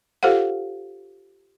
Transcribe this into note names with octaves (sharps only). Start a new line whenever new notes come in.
F4 G4 A4 C5 F5 F#5